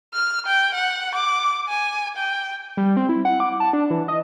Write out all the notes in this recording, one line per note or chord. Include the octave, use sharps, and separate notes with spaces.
F6
G5
F#5
D6
G#5
G5
G3
C4
E4
F#5
D6
A5
D4
E3
D#5